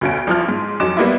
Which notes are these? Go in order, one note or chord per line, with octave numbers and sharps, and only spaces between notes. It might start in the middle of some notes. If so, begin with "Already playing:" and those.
D2 B2 C#4 F#4 D7
A1 F3 F6
G#2
F2 F#3 C#4 D#4 D6 E7
G3 A#3 B3 D#4 E4